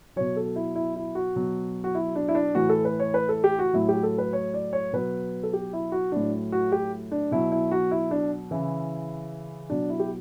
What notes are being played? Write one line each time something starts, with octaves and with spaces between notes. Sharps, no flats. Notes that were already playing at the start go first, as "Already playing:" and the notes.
B2 F#3 C#5
A4
E4
E4
E4
F#4
B2 F#3
F#4
E4
D4
E4
D4
A2 E3 F#4
A4
B4
C#5
B4
A4
G4
F#4
A2 F#3 E4
G4
A4
B4
C#5
D5
C#5
B2 F#3 B4
A4
G4
E4
F#4
A2 F#3 D4
F#4
G4
D4
B2 F#3 E4
E4
F#4
E4
D4
C#3 E3 E4
B2 F#3 D4
E4
G4